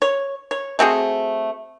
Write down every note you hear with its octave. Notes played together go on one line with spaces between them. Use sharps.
C#5
C#5
A3 C4 F#4 G#4